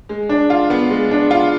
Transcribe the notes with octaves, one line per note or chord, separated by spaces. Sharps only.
G#3
D4
F4
B3
G#3
D4
F4